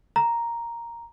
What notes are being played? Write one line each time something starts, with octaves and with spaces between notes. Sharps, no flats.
A#5